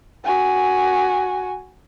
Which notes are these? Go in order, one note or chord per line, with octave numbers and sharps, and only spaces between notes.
F#4 G#5